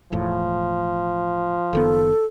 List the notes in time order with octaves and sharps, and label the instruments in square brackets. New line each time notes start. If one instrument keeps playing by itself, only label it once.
[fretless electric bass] E1 E2 A2 [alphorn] F3
[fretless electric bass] F#1 D#3 B3 [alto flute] A4